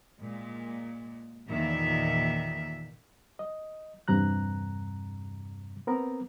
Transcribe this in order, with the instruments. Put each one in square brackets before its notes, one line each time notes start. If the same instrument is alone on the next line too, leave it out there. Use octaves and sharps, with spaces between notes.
[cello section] A#2 G#3
E2 A#2 D#3 E5
[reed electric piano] D#5
E2 G2 C3 A#5 F#6
B3 C4 A#4 A#5